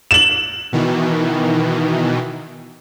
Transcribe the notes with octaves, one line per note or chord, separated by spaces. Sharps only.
E7 F#7
B2 D#3 E3